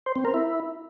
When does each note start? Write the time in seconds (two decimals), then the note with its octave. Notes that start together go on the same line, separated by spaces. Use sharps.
0.06 C5
0.16 C4
0.25 A#4
0.34 E4